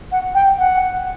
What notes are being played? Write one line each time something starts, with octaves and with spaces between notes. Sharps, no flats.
F#5
G5
F#5